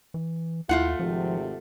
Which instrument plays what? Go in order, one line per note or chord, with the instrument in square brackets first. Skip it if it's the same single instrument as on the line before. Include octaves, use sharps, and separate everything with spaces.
[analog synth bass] E3
[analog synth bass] D#2 [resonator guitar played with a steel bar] A3 F4 F#5 [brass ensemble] E4
[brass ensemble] G#1 C3 [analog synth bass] F3